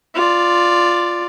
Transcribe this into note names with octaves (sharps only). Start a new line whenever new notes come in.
F4 D5